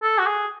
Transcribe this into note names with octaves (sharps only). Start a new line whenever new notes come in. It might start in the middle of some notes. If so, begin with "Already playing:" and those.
A4
F#4
G#4